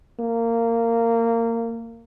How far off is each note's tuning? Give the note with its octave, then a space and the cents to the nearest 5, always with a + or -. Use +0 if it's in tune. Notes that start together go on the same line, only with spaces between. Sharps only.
A#3 -20